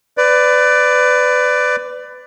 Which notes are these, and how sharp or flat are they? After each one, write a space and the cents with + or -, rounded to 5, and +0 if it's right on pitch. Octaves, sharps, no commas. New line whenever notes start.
B4 +25 D5 +0